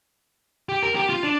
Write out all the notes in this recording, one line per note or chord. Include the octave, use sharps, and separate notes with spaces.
G4
A#4
G4
F4
D4